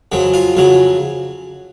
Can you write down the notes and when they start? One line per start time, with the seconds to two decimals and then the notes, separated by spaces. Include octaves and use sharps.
0.12 F2 C#3 F#3
0.34 F4
0.55 F2 C#3 F#3